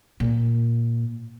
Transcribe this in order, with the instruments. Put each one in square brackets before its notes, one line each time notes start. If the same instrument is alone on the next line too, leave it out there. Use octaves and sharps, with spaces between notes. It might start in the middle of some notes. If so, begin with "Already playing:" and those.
[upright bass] A#2